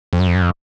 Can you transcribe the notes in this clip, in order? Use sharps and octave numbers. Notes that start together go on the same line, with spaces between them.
F2
F#2
F2
F#2
F2